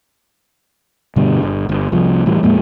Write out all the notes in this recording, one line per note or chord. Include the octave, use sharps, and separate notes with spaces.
G2 B2 D3 G3
G1
G1
C2 F3
A2 E3 G3
F2 A#2 G#3 A#3